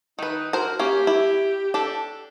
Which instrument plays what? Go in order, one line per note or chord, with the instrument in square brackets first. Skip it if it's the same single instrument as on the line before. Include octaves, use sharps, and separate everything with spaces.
[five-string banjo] D#3 B4 [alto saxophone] D#4
[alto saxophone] F#4 [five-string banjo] A#4 C5
[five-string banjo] A#3 C#4 [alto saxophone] G4
[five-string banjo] E4
D4 G4 A4